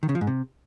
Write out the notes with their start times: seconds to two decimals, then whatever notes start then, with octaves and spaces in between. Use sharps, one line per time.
0.03 D#3
0.09 C#3
0.15 F3
0.21 G#2
0.27 C3